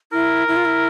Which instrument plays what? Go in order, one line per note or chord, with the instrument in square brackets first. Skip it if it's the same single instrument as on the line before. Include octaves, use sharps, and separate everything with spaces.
[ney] E4 [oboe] A#4
[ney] E4
F4
E4